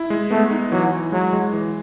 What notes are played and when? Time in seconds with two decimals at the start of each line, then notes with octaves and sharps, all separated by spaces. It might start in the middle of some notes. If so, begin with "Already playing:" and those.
Already playing: E4
0.10 G#3
0.30 A3 B3
0.51 D#4
0.72 E3 F#3
0.92 E3
1.12 F#3 G#3
1.33 G#3
1.53 E3